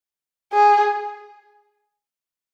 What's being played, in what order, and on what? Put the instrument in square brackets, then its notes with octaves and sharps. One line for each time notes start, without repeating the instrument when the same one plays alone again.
[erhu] G#4